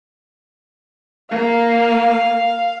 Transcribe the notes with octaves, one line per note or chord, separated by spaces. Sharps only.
A#3 F5